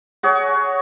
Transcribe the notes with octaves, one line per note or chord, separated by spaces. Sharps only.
F#4 G#4 C#5